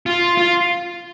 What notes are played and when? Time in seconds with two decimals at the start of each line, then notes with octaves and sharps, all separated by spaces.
0.06 F4
0.38 F4